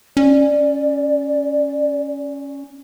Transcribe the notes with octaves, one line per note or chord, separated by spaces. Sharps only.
C#4 D5